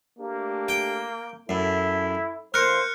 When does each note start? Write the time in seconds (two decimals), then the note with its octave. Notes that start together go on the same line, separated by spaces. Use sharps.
0.19 A3 A#3 D4 G4
0.68 G5
1.49 F#2 E4 A4
2.54 E3 A3 A#3 A#4 C5 F6 F#6 C#7